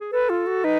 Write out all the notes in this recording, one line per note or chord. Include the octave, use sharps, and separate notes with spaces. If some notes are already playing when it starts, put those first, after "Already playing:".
G#4
A4 B4
F4
F#4
D#4 B4